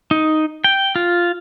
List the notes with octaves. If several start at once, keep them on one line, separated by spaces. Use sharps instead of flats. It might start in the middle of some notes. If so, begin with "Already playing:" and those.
D#4
G5
F4